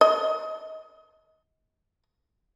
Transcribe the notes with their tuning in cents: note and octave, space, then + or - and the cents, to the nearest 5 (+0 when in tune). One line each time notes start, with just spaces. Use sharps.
D#5 +35